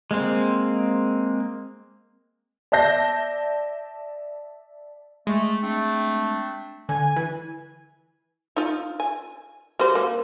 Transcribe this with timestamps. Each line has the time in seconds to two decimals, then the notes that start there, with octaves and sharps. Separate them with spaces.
0.11 G#3 A#3 C4
2.72 D5 E5 A5 G6 A#6
5.27 G#3 A3
5.61 A3 C4 D4
6.89 D3 G#5
7.16 E3
8.56 D#4 F4
9.00 G#5
9.79 G3 F#4 C5
9.95 A#3